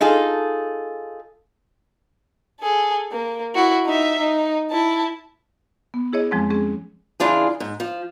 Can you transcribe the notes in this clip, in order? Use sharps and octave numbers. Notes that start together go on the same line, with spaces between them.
D#4 F4 G#4 A4
G#4 A4
A#3
E4 F#4
D#4 E5
D#4
E4 A5
B3
E4 G#4 C#5 D#5
F2 F3 G#3 C4
G#3 C4 C#4 G#4
C#3 E3 D4 F4 G#4
G#2
F3